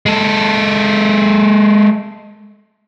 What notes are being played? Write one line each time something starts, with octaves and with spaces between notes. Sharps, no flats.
G#3 A4